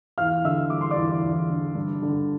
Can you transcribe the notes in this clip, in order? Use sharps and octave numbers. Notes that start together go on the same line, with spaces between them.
E2 F5 F6
D3 E5 E6
G3 D6
C6
D5 D6
E2
E2
D3
G2
D3